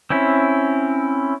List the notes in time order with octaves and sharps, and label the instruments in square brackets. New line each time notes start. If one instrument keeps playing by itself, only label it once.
[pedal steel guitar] C4 C#4 E4